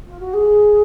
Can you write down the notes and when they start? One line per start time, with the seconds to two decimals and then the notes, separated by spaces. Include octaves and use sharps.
0.07 F4
0.20 F#4
0.33 G#4